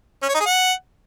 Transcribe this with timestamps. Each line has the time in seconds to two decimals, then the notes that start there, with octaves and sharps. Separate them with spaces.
0.23 C#4
0.28 C#5
0.34 D#4
0.40 G#4
0.46 F#5